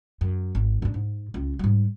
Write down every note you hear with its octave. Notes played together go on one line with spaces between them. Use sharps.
F#2
G#1
G2 D4
G#2
C#2 F4
G#2 G3